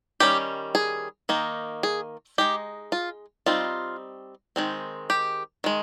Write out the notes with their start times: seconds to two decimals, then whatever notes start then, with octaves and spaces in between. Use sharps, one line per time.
0.20 D#3 G3 C#4 G4
0.75 G#4
1.29 D#3 A#3 D#4
1.83 G#4
2.38 G#3 D#4 G4
2.92 F4
3.46 G3 C4 D#4 F4
4.56 D#3 G#3 C4
5.10 G4
5.64 D#3 G#3